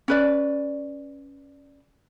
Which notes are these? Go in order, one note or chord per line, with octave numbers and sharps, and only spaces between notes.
C#4 B4 D5